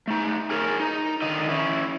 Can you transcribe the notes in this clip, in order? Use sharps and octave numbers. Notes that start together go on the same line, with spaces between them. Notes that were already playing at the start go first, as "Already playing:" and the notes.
A3 D#4
G#4 A#4 C#5
D#4
D3 D#3 D#5
C#4 E4